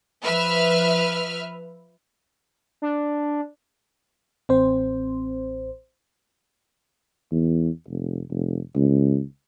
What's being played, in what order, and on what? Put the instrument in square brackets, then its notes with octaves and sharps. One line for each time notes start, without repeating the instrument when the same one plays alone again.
[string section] F3 B4 E5 F6
[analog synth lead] D4
[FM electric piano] A1 C4 C5
[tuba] E2
F1
F1
C#2